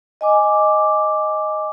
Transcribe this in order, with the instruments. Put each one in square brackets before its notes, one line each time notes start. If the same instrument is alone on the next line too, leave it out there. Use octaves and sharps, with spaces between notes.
[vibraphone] D#5 G#5 D6